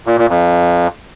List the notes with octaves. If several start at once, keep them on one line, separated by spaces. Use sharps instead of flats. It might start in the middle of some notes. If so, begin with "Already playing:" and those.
A#2
A#2
F2